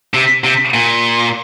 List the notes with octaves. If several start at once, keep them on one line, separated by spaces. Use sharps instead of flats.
C3
C3
A#2